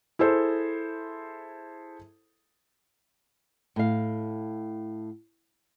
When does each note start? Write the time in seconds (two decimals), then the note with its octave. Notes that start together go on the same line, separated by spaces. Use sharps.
0.19 E4 G#4 A4 C5
3.76 A2 F5